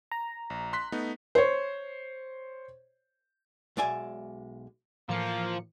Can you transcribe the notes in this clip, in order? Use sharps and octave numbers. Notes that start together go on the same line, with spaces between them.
A#5
A#1
C6 F#6 B6
A3 B3 D#4
C5 C#5
B1 G#3 D5 E5 G#5
A2 E3 F3 A#3 C#7